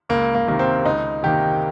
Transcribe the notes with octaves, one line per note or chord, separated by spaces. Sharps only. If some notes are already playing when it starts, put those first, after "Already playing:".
C#2 A#3
A#3
C3 D#3 A#3
C4
C#2 D#4
C3 D#3 A#3 G4